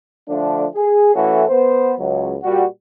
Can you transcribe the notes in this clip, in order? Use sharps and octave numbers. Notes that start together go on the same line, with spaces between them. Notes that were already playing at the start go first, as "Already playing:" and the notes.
D3 F3 A3 D4
G#4
A2 E3 A3 C#4 F#4 A4
B3 C5
C#2 F#3
A#2 G3 F#4